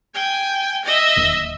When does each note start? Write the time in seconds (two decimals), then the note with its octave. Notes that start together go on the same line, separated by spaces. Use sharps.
0.15 G5 G#5
0.85 D#5 E5
1.16 D1 D#2